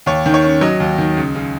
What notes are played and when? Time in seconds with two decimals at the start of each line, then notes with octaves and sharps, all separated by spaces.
0.06 D#2 C#5
0.26 D#3
0.34 C#5
0.44 C#4
0.61 F#3 D#5
0.80 D#2
0.98 D#3
1.17 C#2
1.35 C#3